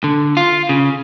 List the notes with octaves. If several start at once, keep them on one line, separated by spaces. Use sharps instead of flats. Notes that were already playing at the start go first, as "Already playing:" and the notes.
D3
F4
C#3